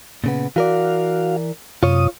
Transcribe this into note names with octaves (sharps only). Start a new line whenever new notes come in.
A#2 C#3 B3
E3 F#4 A#4 D5 F5
F#2 C3 F4 C#5 D#6